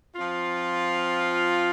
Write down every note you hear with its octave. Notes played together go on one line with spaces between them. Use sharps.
F3 C4 F4